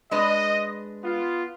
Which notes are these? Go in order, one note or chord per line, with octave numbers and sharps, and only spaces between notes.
G#3 D4 B4 D#5
B3 F4